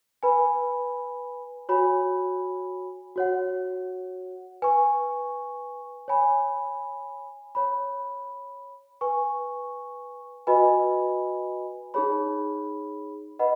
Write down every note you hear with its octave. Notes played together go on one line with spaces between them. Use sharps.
B4 G#5 B5
F#4 C#5 G#5 B5
F#4 C#5 F#5
B4 G#5 C#6
C#5 G#5 B5
C#5 B5
B4 G#5 C#6
F#4 B4 D#5 G#5 B5
D#4 G#4 C#5 B5
B4 D#5 F#5 B5